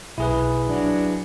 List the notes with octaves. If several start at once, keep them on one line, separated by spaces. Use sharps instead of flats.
B1 E4 G#4 B4
F#3 D4